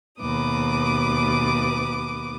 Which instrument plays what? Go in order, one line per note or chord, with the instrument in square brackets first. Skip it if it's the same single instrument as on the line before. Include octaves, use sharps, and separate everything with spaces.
[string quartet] D#2 B2 B4 D6 D#6